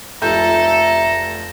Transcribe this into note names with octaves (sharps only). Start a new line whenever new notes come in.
F1 A3 F4 A4 A#5 G6